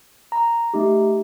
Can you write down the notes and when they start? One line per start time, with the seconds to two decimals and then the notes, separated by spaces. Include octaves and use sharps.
0.32 A#5
0.74 A3 D#4 G4